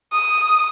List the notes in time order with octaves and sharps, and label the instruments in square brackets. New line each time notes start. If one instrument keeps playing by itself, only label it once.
[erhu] D#6